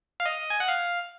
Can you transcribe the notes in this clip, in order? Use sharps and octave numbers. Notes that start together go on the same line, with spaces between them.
F5
D#5
G#5
F#5
F5